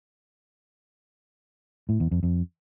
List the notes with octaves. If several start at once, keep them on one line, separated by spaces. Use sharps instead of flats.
A2
E2
F2
F2